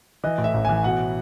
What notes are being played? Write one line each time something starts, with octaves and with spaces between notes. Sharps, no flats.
E3 D#5
A2
E5
A1
E3 G#5
B2 F#5